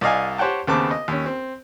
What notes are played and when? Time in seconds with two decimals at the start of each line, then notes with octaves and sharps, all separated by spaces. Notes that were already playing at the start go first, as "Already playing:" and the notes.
0.01 C2 D5 D#5 F5 G#5
0.38 G4 C5 C#5 F#5 G5 A5
0.67 D#2 C#3 B3 C4 A5 D6
0.91 D#5
1.08 D#2 C#4
1.26 C4